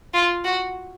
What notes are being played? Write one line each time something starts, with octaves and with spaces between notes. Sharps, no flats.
F4
F#4